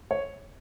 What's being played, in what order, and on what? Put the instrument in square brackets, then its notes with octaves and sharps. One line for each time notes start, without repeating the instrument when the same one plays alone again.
[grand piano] C#5